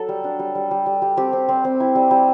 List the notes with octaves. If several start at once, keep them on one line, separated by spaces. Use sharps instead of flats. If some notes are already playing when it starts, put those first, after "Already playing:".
Already playing: F#3 A4
G3
D4
G3
G3
G3
G3
G3
C4 G4
C4
C4
C4
E4
G3
G3